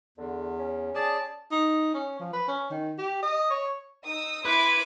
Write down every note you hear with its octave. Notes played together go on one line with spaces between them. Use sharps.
E2 D3
C#4
G#4 D5 A5
D#4
C#4
F3
B4
C#4
D#3
G4
D#5
C#5
D#4 D#6 E6
E4 B4 C6 D6 G#6 D7